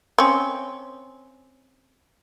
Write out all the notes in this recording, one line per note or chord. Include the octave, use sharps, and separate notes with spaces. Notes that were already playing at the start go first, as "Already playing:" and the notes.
C4 C#4